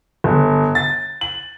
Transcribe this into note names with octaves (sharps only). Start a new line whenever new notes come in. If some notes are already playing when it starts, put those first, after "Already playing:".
G1
A6
F#7